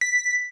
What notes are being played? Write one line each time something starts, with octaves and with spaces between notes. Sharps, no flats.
B6